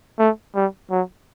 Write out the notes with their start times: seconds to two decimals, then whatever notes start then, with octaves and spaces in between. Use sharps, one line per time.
0.19 A3
0.55 G3
0.90 F#3